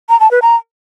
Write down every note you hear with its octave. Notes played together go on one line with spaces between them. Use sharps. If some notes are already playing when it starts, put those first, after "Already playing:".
A#5
A5
B4
A#5